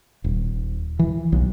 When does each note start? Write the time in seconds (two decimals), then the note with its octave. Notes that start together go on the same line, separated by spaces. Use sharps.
0.24 D#1
0.99 E3
1.32 B1